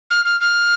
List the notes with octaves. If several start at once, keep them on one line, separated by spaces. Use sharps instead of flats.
F6
F6
F6